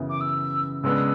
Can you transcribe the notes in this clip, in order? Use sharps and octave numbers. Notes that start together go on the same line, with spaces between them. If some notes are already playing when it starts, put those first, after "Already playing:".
Already playing: F#2 C#3 E3 B3
D6
E6
C#3 G#3 B3 D4 E6